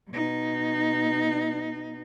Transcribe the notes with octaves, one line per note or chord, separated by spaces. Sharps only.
B2 D#4